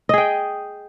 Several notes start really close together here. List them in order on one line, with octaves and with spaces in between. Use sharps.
D#5 G#4 G5